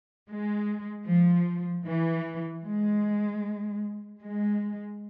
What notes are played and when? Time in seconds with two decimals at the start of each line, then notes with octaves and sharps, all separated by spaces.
0.30 G#3
1.07 F3
1.85 E3
2.65 G#3
4.19 G#3